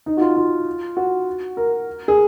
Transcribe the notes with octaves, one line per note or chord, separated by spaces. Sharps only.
D#4
F#4
F4
F4
F#4
A#4
G#4